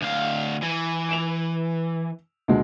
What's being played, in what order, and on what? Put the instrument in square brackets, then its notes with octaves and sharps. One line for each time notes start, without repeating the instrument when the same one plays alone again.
[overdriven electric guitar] D2 F5
E3
[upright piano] D7 E7 F7
D2 B2 G#3